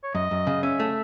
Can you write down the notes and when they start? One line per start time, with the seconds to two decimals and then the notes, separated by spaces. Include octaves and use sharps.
0.03 C#5
0.15 F#2 D#5
0.31 F#2
0.47 C#3
0.63 C#4 E5
0.80 A3